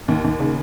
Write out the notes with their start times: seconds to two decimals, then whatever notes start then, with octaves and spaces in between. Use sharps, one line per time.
0.08 D#2
0.24 D#2
0.40 C#3